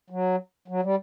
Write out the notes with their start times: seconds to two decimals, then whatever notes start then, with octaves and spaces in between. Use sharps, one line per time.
0.10 F#3
0.68 F#3
0.83 G3